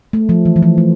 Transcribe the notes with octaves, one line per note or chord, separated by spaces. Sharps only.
A3
F3
E3
E3
F3
A3